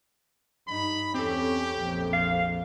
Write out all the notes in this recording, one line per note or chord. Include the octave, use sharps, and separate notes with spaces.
G2 D#4 B5
E2 C4 C#4 G4 A4
A#1 F2
F5